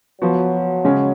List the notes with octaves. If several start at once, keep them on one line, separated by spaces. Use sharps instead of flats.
F3 F#3 B3 F#4
C#3 G#3 C#4 G#4